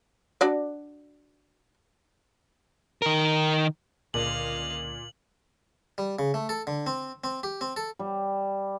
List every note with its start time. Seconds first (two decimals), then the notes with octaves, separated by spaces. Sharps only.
0.41 D4 F#4 D5
3.02 D#3 A#4
4.14 C#2 A#2 D3 D#5 F5 F#7
5.98 G3
6.19 C#3
6.34 A3
6.49 A4
6.67 D3
6.87 C4
7.24 C4
7.43 G4
7.61 C4
7.76 A4
7.99 G3